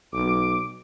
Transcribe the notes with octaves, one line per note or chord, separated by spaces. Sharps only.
B1 D6